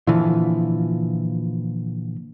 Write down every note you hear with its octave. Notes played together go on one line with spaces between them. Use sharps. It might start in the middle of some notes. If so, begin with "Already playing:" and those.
A#2 D3 E3 F3